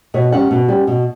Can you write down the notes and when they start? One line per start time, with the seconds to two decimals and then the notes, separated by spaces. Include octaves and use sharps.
0.14 B2 C#5
0.32 G3 C#4 F#5
0.51 B2
0.68 G3 C#4
0.87 B2